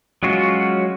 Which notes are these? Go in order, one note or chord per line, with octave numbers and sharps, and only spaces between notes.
F#3 G#3 C#4 F4 F#4